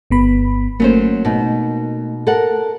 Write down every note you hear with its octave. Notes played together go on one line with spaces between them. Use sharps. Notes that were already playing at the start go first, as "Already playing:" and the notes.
G1 B3 B5
F#3 A3 A#3 C#4 C5
B2 D#4
A4 A#4 F#5